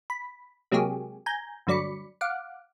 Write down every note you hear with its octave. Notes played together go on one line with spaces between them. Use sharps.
B5
C3 F#3 G#3 A#3 G4 G#4
G#5 A#5 G6
D2 G2 F#3 D5 B5 C#7
F5 F#5 D6